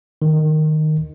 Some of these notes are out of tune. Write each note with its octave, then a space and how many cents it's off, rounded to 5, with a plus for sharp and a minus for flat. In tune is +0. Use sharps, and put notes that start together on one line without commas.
D#3 -10